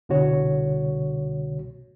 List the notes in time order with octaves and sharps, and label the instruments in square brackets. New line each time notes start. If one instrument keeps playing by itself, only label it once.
[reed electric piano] C2 B2 D3 F#4 C#5